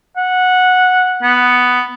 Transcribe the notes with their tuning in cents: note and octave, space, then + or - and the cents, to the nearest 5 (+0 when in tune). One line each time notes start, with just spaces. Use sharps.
F#5 -10
B3 +5